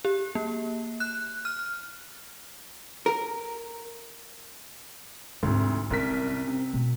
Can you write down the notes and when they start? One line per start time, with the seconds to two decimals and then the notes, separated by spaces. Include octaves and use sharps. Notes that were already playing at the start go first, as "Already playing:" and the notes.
0.05 G4
0.35 A#3
1.00 F#6
1.45 F6
3.06 A#4
5.43 D2 G#2 C3 F4
5.91 C2 C#4 A#4 B6
6.48 C3
6.74 B2